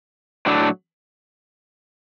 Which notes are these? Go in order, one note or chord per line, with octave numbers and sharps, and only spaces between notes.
A2 F#3 A3 D4